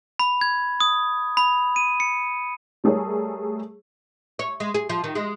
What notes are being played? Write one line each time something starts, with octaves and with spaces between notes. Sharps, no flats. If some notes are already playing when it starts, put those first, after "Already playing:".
B5
G#6
D#6
B5
D#7
C#7
G3 A3 G#4 A#4 C#5
C#5
G#3
G#4
F3
D#3
G#3